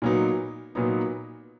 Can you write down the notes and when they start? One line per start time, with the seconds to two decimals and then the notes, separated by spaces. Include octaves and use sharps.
0.02 A#2 F#3 B3 D#4
0.75 A#2 F#3 B3 D#4